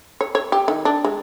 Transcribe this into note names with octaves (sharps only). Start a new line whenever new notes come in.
C#5
C#5
G4
D#3
D4
G#3